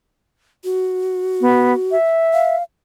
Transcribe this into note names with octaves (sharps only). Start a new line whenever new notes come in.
F#4
B3
E5
F5